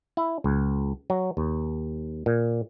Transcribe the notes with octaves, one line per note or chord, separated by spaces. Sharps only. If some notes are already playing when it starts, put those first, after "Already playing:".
E4
C#2
F#3
D#2
A#2